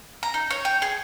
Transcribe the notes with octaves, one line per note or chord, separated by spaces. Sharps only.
A#5
D#4
C#5
G5
G#4